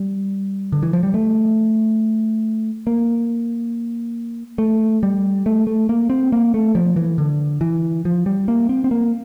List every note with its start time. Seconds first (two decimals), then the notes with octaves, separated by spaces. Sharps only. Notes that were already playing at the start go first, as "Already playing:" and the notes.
Already playing: G3
0.72 D3
0.82 E3
0.93 F3
1.03 G3
1.14 A3
2.87 A#3
4.58 A3
5.03 G3
5.46 A3
5.67 A3
5.89 A#3
6.10 C4
6.32 A#3
6.54 A3
6.75 F3
6.96 E3
7.18 D3
7.61 E3
8.05 F3
8.26 G3
8.48 A#3
8.69 C4
8.84 C4
8.91 A#3